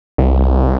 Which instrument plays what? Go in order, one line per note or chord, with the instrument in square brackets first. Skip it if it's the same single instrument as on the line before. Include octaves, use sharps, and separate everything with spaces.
[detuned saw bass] C2